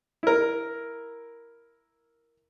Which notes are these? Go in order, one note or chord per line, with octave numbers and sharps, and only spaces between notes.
E4 A#4